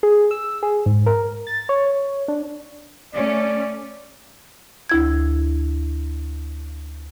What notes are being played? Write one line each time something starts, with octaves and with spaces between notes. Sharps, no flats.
G#4
E6
G#4
G#2
A#4
A6
C#5
D4
A3 C#4 D5
D2 E4 G#6